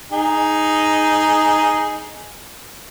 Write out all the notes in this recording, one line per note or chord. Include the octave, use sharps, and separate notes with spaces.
D#4 G#4